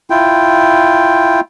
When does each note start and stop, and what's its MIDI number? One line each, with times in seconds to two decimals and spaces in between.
0.10 1.40 64
0.10 1.40 65
0.10 1.40 79